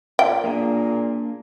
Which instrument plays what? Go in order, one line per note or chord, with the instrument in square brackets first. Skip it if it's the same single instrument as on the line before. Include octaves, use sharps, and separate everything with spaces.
[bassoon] A#2 [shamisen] G5
[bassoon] A#2 [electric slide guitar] A#3 D4 G#4